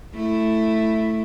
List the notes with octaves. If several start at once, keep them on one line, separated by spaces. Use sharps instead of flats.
A3 E4